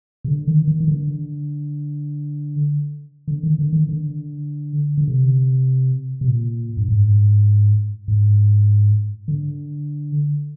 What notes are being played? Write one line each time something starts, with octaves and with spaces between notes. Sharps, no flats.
C3
D3
D#3
D#3
D#3
D3
D3
D#3
D3
D#3
D3
D3
C3
C3
A#2
G2
G#2
G#2
D3